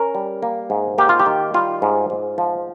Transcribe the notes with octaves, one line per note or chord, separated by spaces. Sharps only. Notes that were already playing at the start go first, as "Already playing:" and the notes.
Already playing: C#4 A#4
G3
A#3
G#2
A#3 G4
F4
G4
D#3
G3 F4
G#2
G#2
F3